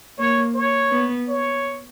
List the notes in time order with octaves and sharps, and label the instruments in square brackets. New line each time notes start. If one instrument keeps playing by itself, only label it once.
[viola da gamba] A#3 [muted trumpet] C#5
[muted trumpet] C#5
[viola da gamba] B3
[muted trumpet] C#5